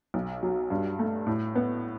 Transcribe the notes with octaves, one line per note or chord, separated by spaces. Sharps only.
B1
F#3
G2
A3
A2
B3